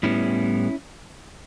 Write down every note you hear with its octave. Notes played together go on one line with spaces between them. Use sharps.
A2 G3 B3 C#4 E4